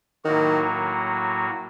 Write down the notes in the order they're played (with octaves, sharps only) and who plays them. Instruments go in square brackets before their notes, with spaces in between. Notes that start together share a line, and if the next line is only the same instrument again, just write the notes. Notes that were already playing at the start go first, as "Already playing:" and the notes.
[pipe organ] A2 F#3 A#3 F#4 [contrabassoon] D#3